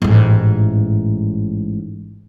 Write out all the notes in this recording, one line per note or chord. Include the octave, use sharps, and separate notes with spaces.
A1 G#2